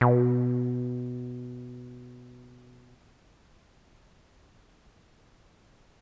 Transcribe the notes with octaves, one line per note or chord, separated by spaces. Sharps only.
B2